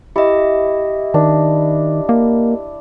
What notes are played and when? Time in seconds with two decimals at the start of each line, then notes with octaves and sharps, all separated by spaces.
0.16 E4 G4 D#5
1.14 D#3 D4
2.09 A#3